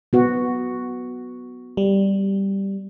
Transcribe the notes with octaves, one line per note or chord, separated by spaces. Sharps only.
B3 F#4
G3